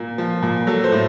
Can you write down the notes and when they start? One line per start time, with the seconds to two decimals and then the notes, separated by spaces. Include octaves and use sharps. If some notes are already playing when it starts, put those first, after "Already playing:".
Already playing: A#2
0.18 F3
0.42 A#2
0.67 F#3 A4
0.84 C5
0.92 A2